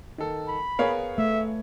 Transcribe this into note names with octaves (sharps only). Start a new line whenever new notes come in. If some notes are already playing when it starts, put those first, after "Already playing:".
D#3 A4
B5
B3 G#4 A#4 C#5 F5
A3 E5